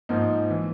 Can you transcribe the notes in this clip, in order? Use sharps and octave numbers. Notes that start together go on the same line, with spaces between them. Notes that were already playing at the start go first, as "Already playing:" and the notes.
G#2 F3 A#3 D#4
E3